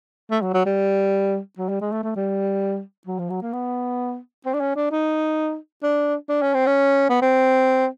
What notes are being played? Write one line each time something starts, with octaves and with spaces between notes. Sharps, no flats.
A3
F#3
F#3
G3
F#3
G3
G#3
A3
A3
G3
F#3
F3
F#3
A#3
B3
C4
D4
C#4
D4
D#4
D4
D4
C#4
C4
C#4
B3
C4